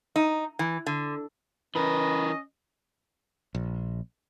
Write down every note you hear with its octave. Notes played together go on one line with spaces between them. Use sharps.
D#4
E3
D3
E3 C#4 A#4 B4 D#5
A#1